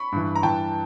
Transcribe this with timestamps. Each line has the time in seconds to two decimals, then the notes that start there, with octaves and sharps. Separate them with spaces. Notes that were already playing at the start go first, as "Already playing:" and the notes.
Already playing: B5 C#6
0.12 G2 E3
0.35 A#5
0.43 G2 E3 G5 A5